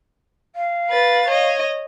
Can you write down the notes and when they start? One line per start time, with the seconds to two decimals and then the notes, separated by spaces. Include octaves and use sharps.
0.56 F5
0.90 B4 A6
1.28 C#5 D#5